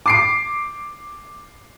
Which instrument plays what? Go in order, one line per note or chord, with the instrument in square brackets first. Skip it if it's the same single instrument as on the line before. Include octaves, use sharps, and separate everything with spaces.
[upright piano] D6 C7 D7